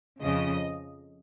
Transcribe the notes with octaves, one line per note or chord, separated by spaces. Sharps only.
F2 C#3 F3 D#5